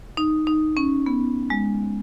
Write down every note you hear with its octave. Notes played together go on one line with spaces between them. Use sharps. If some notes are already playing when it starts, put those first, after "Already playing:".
D#4
D#4
C#4
B3
G#3